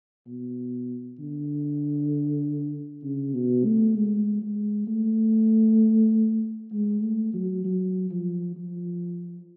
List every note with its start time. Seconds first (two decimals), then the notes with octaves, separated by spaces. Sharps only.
0.27 B2
1.19 D3
3.03 C#3
3.34 B2
3.65 A3
3.96 G#3
4.42 G#3
4.88 A3
6.72 G#3
7.02 A3
7.34 F#3
7.65 F#3
8.11 F3
8.56 F3